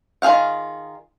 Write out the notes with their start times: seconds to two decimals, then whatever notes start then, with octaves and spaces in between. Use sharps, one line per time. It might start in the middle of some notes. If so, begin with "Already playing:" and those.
0.22 D#3 F4 G#4 F5 F#5